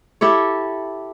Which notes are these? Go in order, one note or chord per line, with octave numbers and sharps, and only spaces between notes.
E4 G4 A4 C#5